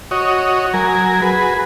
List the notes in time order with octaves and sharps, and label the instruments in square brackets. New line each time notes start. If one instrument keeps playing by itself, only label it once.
[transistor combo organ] F#4 C#5 D#5
F#3 A#4 G#5
F#4 G#4 B4